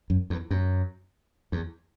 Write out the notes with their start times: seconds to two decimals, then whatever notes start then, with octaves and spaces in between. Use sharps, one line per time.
0.10 F#2
0.30 E2
0.51 F#2
1.52 E2